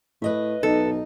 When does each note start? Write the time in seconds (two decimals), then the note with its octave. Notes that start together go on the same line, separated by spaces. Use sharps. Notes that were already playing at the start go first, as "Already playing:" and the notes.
0.22 A2 B4 D#5 E5
0.63 B1 D#4 A4